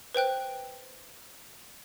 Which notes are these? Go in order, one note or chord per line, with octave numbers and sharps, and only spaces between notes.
B4 C5 G5 F#6